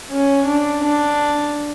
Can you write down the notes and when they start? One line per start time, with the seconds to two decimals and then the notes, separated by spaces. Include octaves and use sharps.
0.10 C#4
0.46 D4
0.84 D4